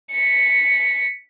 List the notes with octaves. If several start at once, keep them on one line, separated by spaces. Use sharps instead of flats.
B6 C#7